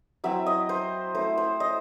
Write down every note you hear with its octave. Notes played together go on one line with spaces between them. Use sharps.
F#3 C4 E4 E5
D#5
C5
A3 E4 C5
C5
D#5